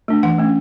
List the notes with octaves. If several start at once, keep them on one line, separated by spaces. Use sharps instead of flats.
A3 D4
E3 F#5
A3 C#4